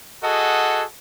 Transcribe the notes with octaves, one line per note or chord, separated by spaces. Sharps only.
F#4 G#4 A4 D#5 F#5